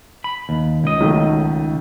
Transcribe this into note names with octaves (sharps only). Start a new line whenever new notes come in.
B5
D#2
C#2 D#5
B1 D#3 A3